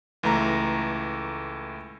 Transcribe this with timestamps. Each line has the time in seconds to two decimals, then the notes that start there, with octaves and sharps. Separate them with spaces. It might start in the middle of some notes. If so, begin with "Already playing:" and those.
0.23 C#2 E3 A3 A#5